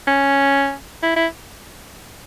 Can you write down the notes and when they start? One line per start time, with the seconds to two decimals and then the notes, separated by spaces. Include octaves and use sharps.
0.08 C#4
1.03 E4
1.16 E4